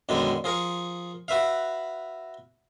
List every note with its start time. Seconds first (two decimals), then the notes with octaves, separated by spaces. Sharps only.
0.09 F#2 B2 D3 D#3 G#3 D4
0.44 F3 G#4 A#4 C#6
1.28 F#4 B4 E5 F5